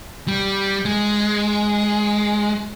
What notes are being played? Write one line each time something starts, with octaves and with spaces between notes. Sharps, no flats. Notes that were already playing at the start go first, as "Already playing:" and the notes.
G3
G#3